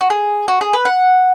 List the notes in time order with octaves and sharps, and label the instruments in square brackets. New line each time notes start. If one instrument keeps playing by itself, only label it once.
[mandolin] F#4
G#4
F#4
G#4
B4
F#5